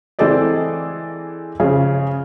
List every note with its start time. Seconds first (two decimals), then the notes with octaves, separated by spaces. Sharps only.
0.19 E3 C4 G#4 A4 D5 D#5
1.60 C#3 F3 G#4